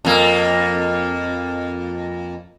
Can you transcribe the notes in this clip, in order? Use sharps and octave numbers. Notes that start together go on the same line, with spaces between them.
F2 A#3